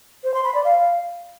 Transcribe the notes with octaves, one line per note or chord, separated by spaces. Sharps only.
C5
C6
B5
D5
F5